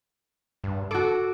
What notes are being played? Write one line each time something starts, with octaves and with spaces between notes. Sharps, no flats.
G2
F#4 A4 D6